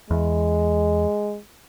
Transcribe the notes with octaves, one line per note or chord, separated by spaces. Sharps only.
E2 G#3